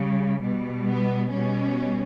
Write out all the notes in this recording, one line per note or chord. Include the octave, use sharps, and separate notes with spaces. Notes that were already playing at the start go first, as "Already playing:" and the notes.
Already playing: C#3 G3
B2 G3
B3
B2 G3 C#4